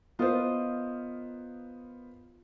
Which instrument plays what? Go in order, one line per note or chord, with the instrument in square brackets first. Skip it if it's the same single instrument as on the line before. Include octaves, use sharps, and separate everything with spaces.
[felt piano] B3 A#4 C5 [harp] F4 D#5